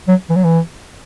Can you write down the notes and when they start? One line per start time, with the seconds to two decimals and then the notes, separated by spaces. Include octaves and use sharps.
0.08 F#3
0.30 E3
0.36 F#3
0.44 E3